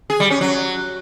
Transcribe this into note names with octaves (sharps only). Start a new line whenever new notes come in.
G#4
G3
C#4
F#3